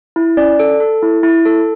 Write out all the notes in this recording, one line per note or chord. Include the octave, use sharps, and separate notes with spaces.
E4
C#4 D5
A4
A4
E4
E4
A4